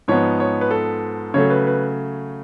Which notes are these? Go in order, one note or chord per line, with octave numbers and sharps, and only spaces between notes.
G#2 F3 B3 C#5
C#5
B4
A4
C#3 F#3 A3 C#5
B4
B4